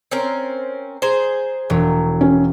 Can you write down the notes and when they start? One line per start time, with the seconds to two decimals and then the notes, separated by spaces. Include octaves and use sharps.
0.11 C4 C#4 A#4
1.02 G#4 C5 A#5
1.70 E1 F#3
2.21 C#4